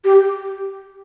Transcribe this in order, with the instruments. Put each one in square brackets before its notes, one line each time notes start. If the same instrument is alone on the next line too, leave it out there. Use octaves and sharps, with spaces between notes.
[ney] G4